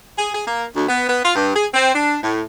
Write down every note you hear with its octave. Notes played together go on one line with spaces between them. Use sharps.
G#4
G#4
A#3
D2
B3
B3
F4
G2
G#4
C4
D4
A2